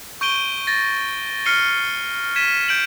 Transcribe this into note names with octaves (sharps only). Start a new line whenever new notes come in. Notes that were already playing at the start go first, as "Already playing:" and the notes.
C#6 G6 D7 D#7 G7
A6 A#6
F6 A#6 C7 C#7 D#7 G7
G#6 B6 D#7 E7
G6 D7 F#7